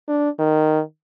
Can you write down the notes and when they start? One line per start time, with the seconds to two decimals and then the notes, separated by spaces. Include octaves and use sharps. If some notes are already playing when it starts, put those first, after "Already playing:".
0.08 D4
0.39 D#3